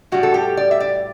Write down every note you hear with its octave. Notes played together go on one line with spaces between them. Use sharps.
A2 G3 F#4
A4
G4
D5
E5
D5